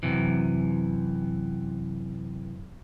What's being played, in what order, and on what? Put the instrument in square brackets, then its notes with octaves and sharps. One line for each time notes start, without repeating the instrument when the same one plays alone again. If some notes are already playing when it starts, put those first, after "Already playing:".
[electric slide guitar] F#2 C3 E3